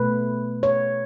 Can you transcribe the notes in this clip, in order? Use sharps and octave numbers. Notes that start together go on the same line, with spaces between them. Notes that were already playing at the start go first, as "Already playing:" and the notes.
Already playing: B2 A3 B4
C#5